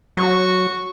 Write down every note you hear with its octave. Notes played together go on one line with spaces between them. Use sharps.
F#3 F#4 C#6